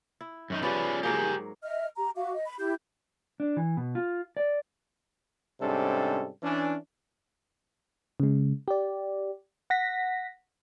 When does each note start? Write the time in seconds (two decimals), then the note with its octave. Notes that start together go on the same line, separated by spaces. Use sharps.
0.21 E4
0.50 F#2 D#3 D#4
0.62 F3 G3 C#4 G#4 B4 D5
1.03 G#2 F#3 A#3 G4 G#4 A#4
1.63 D#5 E5 F6
1.96 G4 A#5
2.15 F#4 E5 F5 D6
2.33 D#5
2.46 B5
2.59 E4 G4 G6
3.40 D4
3.57 E3
3.77 B2
3.95 F4
4.37 D5
5.61 G#2 C3 G3 C#4 D4 A4
6.43 E3 C#4 D4
8.20 C#3 G#3
8.68 G4 D5
9.70 F#5 A#6 B6